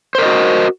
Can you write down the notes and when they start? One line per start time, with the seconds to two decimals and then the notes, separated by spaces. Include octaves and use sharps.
0.15 C5
0.18 A#4
0.22 D#5
0.26 F#4